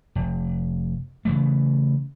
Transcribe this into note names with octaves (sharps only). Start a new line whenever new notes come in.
F1
C#3 E3 A3